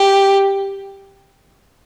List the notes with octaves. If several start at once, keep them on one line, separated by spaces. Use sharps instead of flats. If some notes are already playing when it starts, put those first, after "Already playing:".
Already playing: G4